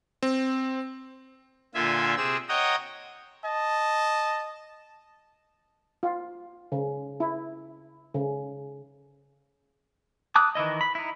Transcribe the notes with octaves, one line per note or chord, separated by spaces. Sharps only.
C4
A#2 D3 F4 E5 G#5
C3 C4 G#4 E6
C#5 D#5 F#5 G5 A#5 D#6
D#5 A5
F4
C#3
E4
C#3
A5 D6 D#6 F#6
D#3 E3 E4 D#5
B5
D#4 E4